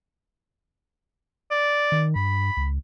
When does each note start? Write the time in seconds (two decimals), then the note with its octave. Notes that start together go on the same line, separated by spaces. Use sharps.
1.51 D5
1.92 D#3
2.16 G2 B5
2.57 C#2